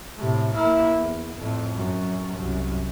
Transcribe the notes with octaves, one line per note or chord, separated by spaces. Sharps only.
A2 C3
A#3 E4
E2
F2 A2
F#2
C2 F#2